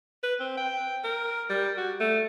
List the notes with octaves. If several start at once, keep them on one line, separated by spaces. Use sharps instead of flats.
B4
C4
G5
A#4
G3
F#4
A3